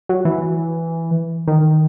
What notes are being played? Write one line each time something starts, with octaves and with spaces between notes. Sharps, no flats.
F#3
E3
D#3